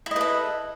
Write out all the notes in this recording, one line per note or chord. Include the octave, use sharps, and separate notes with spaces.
E4 A4 B4 D#5